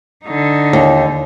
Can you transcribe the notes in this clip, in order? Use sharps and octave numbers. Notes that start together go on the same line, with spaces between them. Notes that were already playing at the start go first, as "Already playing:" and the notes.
D3 D#4
D#2